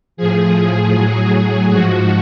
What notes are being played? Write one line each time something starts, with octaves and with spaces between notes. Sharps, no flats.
A2 F3 G#4
A2 F#3
G#2 F3 F#4